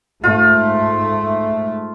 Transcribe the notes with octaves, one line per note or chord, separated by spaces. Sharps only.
G#2 A3 F4